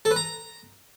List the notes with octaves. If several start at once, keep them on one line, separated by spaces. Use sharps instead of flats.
A4
B4
A#5